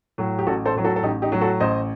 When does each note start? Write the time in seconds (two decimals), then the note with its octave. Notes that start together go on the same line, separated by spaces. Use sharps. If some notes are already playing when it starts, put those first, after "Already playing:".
0.18 A2 F#3
0.39 G4
0.46 A1 F#4 A4
0.66 A4 C5
0.75 A2 F#3
0.84 F#4 A4
0.96 A4
1.03 A1 D#4 G4
1.22 D#4 G4
1.32 A2 F#3
1.41 F#4 A4
1.60 A1 C5 D#5